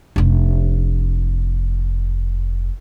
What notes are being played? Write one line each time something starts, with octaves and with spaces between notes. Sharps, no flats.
F1 D4